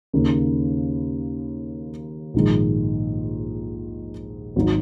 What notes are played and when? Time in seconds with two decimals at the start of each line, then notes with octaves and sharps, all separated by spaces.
0.13 D#2 C#3 A#3 D#4
2.34 A#1 G#2 D#3 G#3
4.56 G#1 F#3 D#4